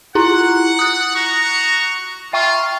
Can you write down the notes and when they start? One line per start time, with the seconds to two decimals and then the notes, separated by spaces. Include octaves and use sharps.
0.15 E4 F4 F#5 A#5
0.79 D#6 F#6
1.16 F#4 A#5 C#6
2.33 F4 E5 G5 C#6